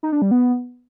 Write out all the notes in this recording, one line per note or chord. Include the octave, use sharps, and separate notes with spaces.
D#4
D4
G3
B3